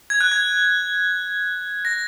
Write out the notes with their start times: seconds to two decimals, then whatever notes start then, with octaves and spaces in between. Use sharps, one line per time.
0.10 G#6
0.21 F#6
0.32 G#6
1.85 A#6